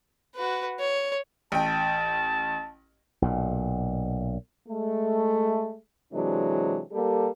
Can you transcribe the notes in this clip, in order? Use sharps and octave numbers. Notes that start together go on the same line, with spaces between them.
F#4 B4
C#5
A1 G5 A5
B1 A#2
G#3 A3
C3 E3 F#3 G#3 D4
G3 A#3 G4 A4